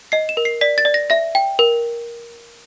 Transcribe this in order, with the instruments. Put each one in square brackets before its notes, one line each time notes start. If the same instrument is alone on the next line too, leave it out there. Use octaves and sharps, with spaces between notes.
[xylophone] D#5 C7
E7
A#4
C7
D5 B6
A6
D5
A#6
E5 A#6
G5
A#4